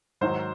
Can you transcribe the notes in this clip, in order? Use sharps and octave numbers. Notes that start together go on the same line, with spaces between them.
G#2 D#3 F#3 C5